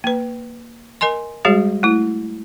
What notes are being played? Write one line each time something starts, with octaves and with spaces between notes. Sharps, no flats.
A#3 B4
A#4 D#5 G#5 C6
G3 G#3 F#4 G#4 C#5
A3 E4